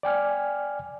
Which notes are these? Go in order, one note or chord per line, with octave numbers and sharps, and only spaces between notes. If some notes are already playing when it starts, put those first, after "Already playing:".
D5 G5 G#5 F6